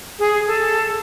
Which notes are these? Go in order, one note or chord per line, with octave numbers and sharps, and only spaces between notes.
G#4
A4